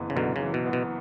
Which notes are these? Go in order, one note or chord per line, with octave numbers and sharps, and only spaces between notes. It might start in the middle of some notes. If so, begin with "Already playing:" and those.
Already playing: F#1 E3 B3
C#3
F#2 B2 D3
C#3
E3
B2
B3
B2